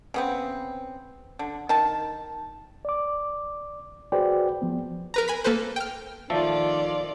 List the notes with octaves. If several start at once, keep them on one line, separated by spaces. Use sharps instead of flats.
C#3 B3 C4
D3
D#3 A5
D5 D6
F#4 G#4 B4 C5 D5 G5
F3 B3
A#4 B4 A#5
G#5 B5 B6
A#3 A4 B4 C5
G5 F6
D#3 F3 A3 F4 A4 D5